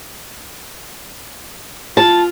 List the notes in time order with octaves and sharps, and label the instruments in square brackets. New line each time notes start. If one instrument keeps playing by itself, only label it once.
[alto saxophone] F4 [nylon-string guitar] A5